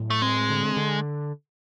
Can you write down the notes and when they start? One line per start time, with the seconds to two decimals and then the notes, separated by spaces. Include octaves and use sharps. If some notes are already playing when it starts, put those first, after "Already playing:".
Already playing: A2 F#3
0.10 A3
0.22 G#3 C4
0.50 D3
0.77 D3